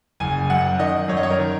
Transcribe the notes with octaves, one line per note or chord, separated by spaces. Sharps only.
F#1 G#5
F#2 F#5
D#3 D#5
F#2 C#5
D#5
C#5
A#4
D#3